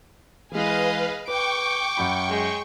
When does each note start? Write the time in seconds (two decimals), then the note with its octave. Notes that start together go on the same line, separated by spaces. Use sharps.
0.52 E3 G#3 G#4 B4 D#5 F5
1.28 B4 G5 C#6 D6
1.97 F#2 F#4 B5
2.30 G#3